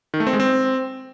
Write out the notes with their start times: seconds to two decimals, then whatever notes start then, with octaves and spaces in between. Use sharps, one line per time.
0.14 D#3
0.20 A3
0.27 C4
0.33 G#3
0.40 C4